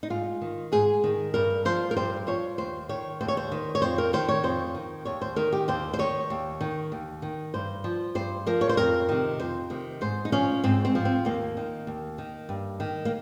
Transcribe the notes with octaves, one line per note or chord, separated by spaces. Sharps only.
D#4
G#2 F4
D#3
G#2 G#4
D#3
G2 A#4
F3 C5
A#4
G2 C5
F3 C#5
D#2 C5
D#3 C#5
D#2 C5
C#5
C5
D#3
C#5
F2 C5
A#4
D#3 C5
C#5
F2 C5
D#3
D#2 C#5
C5
D#3 A#4
G4
D#2 C5
C5
D#3 C#5
D#2
D#3
D#2
D#3
G2 C5
F3
G2 C5
F3 A#4
C#5
C5
F2 A#4
C3 D#3
F2 C5
C3 D#3
G#2 C5
D#4
F3 C#4
G#2 C4
C4
F3
C4
D#2 A#3
D#3
D#2
D#3
G2
D#3
A#3